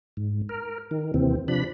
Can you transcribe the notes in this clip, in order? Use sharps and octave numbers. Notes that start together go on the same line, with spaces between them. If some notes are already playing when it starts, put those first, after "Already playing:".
G#2
A#4
D#3
D#2 C3 E3 C4
C3 F3 D4 B5